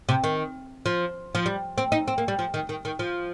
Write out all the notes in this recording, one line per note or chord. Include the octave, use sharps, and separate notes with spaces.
C3
D#3
F3
F3
G3
C4
D#4
C4
A#3
G3
F3
D#3
D#3
D#3
F3